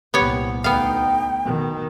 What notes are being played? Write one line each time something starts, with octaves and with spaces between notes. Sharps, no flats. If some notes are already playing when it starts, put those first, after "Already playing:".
C2 A#2 B3 G4 C#5
D2 B3 D#4 F5 G5
B2 D#3